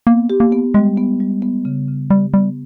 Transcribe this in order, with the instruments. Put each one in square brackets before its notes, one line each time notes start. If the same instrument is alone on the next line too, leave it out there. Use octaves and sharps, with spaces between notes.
[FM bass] A#3 [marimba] B3
[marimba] G4
[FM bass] A#3
[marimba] B3
[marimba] G3 [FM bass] G#3
[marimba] B3
G3
B3
C#3
C#3
[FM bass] G3 [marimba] G4
[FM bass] G3 [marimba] B3